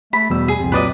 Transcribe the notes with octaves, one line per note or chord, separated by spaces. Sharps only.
A3 B5
E2 B2 G3 E6
G#4
C2 F2 C4
A#2 F#3 B4 D5 D#5